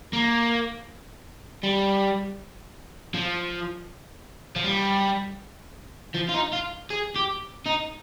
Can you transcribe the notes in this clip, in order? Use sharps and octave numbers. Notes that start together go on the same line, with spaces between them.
A#3
G3
F3
F3
G3
F3
F4
D#4
F4
G#4
G4
D#4